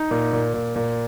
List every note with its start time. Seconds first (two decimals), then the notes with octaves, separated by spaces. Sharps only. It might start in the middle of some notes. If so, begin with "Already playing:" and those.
Already playing: D#4
0.11 A#2
0.33 A#2
0.54 A#2
0.76 A#2